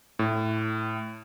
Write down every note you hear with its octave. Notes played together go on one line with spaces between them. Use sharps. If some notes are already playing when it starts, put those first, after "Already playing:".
A2